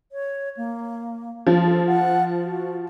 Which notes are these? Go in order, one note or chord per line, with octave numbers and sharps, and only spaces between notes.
C#5
A#3
F3
A4
F#5
F#4